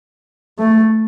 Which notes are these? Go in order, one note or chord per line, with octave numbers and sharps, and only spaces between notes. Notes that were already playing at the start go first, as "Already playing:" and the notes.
A3